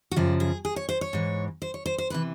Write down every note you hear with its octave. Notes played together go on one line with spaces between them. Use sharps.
F#4
F#2 C#3 F3 G4
G#4
G#4
C#5
C5
C#5
G#2 E3
C5
C#5
C5
C5
C3 E3 B4